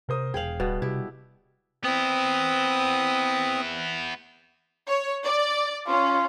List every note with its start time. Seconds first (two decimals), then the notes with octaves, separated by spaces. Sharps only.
0.09 C3 A#4 C5 D#6
0.34 E1 G#4 F5 G5 F#7
0.60 D1 B2 G3 B3
0.82 C3 E4 G4
1.84 B3 C4 E4 D#6
4.87 C#5
5.25 D5
5.87 C#4 F4